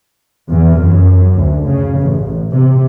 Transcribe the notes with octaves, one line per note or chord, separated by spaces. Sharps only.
E2
F#2
D2
C#3
A1
C3